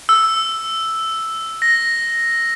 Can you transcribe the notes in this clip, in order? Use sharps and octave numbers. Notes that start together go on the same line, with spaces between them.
E6
A#6